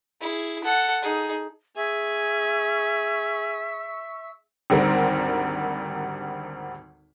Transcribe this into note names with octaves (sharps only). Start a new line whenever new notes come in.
E4 G#4
A4 F#5
D#4 G#4
G#4 E5 G#5 C#6 E6
G#1 D2 G3 C4 A#4